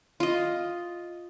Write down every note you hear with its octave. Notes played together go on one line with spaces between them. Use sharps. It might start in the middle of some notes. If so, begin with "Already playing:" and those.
F4 D#5